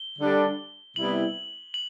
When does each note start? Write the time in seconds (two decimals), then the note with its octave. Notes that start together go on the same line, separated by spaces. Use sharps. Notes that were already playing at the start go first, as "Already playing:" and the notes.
Already playing: G7
0.18 D3 G3 D4
0.96 C3 G3 B3 E4 F#7
1.74 F#7